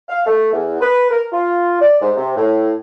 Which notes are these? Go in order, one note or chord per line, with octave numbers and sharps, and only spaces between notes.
F5
A3
E2
B4
A#4
F4
D5
G#2
C3
A2